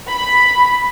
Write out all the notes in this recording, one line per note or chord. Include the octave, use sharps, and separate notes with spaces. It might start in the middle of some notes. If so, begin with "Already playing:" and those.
B5